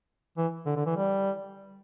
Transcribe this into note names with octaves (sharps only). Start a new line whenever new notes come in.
E3
D3
D3
E3
G3